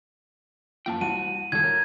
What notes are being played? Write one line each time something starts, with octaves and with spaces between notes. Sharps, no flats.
F#2 F3 A#3 G5 A5
C2 F#4 A5 D#7
A#2 D#3 G3 A4 G#6
A#4 C#5